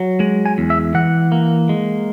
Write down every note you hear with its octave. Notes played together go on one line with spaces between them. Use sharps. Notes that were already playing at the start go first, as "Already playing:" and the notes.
Already playing: F#3
G#3
G#5
E2
E5
E3 F#5
A#3
G#3